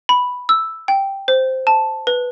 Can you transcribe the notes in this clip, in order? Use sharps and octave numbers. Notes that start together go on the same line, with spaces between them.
B5
E6
G5
C5
A5
B4